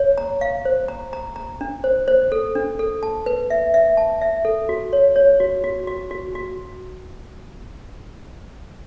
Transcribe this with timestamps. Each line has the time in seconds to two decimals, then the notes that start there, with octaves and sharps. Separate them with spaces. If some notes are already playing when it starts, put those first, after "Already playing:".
Already playing: C#5
0.18 A#5
0.41 F5
0.65 C5
0.88 A#5
1.13 A#5
1.36 A#5
1.61 D4
1.84 C5
2.08 C5
2.32 A4
2.55 D4
2.79 A4
3.03 A5
3.26 B4
3.50 E5
3.74 E5
3.97 A5
4.21 E5
4.45 A4
4.69 F#4
4.93 C#5
5.16 C#5
5.40 F#4
5.64 F#4
5.87 F#4
6.11 F#4
6.35 F#4